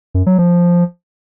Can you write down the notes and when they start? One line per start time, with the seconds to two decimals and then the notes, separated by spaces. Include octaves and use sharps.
0.15 F#2
0.26 F#3
0.38 F3